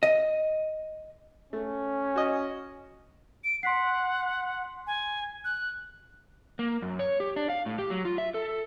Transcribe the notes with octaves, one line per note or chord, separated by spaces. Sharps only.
D#5
A3 C#4
F#4 D#5
D7
F#5 C6 B6 C7
G#5
F#6
A#3
F#2
C#5
G4
D4
F5
A2
G4
F#3
F4
E5
A4